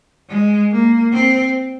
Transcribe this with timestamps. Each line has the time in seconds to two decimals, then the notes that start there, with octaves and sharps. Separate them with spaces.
0.29 G#3
0.72 A#3
1.13 C4